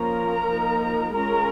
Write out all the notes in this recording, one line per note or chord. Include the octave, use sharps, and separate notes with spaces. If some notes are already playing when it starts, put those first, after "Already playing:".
Already playing: F3 A#3 C#4 F4 A#4 A#5
F3 A#3 D#4
G#3 C#4 F4 A#4 A#5